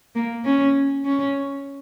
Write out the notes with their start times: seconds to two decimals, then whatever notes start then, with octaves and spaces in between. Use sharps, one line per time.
0.15 A#3
0.45 C#4
1.05 C#4